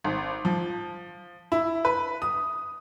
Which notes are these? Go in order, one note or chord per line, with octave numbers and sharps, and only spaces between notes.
G#1
F3
E4
B4
D#6